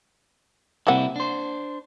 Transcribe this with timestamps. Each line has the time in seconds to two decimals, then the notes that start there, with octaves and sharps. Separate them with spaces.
0.87 C3 G3 A#3 C4 E4 F#5
1.16 D4 C5